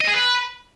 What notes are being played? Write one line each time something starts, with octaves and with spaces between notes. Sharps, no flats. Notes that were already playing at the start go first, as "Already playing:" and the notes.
D#5
G#4
B4